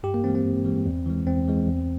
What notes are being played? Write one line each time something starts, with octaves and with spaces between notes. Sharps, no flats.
G2 G4
A#3
E3 G#3 C4
C4
G2
E3 G#3
E2
E3 G#3
E2 C4
E3 G#3
E2